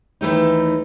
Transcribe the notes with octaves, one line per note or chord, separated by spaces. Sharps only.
D#2 E3 A3 D#4